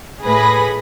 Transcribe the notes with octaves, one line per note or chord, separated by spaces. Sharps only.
A2 G#4 B4 B5 A#6